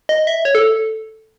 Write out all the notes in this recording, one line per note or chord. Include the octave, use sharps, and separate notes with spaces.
D#5
E5
C#5
A4